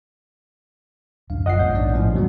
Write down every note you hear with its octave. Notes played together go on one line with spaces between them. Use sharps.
D1 F#2 D4 F5
G1 F#2 F#3 F4 D#5 F#5 C7
A#1 D#2 G#2 B3 C#5 G6
D#3 D4 D5
A2 F3 C#4
E2 B2 D#3 F#3 G3 B3